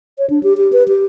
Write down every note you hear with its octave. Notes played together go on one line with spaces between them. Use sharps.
C#5
D4
G4
G4
B4
G4